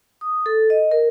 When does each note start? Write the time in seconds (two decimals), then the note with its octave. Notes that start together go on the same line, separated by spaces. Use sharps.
0.21 D#6
0.46 A4
0.70 D#5
0.91 A#4